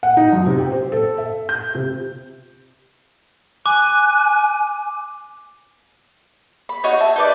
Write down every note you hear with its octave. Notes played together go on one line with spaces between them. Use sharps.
F#5
D#4
F#2
C3
G4
C5
A4
E5
G6
C3
G#5 D6 F#6
B5
D#4 F#4 C#5
E5 A5
D#4 B4 D5